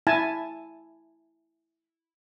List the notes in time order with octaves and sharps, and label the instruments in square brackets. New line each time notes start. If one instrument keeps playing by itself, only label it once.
[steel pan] E4 G#5 A5